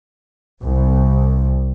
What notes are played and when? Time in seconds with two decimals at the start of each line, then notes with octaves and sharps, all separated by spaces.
0.61 C2